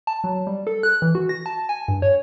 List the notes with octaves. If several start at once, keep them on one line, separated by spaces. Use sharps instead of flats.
A5
F#3
G3
A4
F#6
E3
F#4
A#6
A5
G#5
G2
C#5